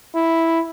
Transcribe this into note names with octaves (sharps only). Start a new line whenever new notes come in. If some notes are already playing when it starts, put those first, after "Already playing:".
E4